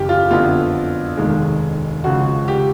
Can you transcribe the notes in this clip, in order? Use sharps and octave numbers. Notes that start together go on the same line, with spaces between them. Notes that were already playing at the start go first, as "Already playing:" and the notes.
Already playing: F#1 F#2 C#3 E3 G4
F4
F2 D3 F#3 B3 E4 F4
F1 D#2 D#3 G#3
C#2 C#3 F3 F#4
G4